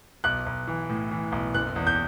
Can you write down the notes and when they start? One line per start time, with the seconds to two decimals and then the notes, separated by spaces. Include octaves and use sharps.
0.24 B1 F#6
0.46 B1
0.67 E3
0.89 A2
1.11 E3
1.32 B1
1.54 F#1 F#6
1.76 E2
1.87 G6